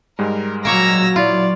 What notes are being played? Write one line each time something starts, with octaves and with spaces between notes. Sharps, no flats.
G#2 G3 G#3 A#4
A#2 F#3 A#3 C#5 A#5 E6 A#6
E4 F4 D5